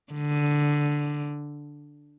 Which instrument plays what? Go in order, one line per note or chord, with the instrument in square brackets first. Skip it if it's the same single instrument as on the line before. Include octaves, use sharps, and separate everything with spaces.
[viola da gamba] D3